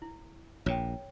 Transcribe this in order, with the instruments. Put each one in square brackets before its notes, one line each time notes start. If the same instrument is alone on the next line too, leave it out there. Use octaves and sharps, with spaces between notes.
[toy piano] E4
[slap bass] A#1 A#2 [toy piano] C#5 G5